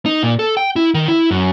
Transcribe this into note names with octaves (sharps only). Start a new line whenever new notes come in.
D#4
A#2
A4
G5
E4
D#3
E4
F#2